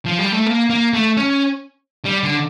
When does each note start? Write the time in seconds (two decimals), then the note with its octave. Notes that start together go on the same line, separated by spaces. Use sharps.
0.06 F3
0.19 G3
0.32 A3
0.46 A#3
0.70 A#3
0.93 A3
1.17 C#4
2.05 G3
2.23 D3